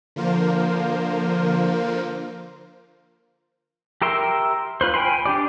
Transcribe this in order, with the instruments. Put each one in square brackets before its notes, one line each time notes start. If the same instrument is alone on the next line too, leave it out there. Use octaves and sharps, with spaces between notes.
[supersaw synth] D3 F3 A#3 F4 A#4 C5
[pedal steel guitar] G4 A#4 E5 C6
F4 B4 C5
G5 G#5 B5 C6
D4 G4 D5